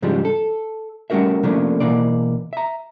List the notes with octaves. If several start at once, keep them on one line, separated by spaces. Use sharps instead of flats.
G#2 C#3 F3 G3 D4
A4
G3 A3 C#4 F#4 A#4 E5
C3 F3 A3 A#3 C#4 D4
B2 E3 A#3 D5
E5 A#5